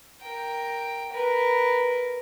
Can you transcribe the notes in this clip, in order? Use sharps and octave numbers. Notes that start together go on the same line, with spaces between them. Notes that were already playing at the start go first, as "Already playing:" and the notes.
A#4 G5
A#4 B4